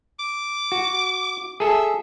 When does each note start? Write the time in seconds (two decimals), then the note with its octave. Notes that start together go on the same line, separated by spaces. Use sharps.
0.20 D6
0.72 F#4
1.60 G#4 A4 E5